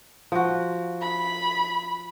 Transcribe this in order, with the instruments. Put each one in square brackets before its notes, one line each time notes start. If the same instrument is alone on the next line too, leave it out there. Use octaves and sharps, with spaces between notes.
[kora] F3 F#4
[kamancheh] B5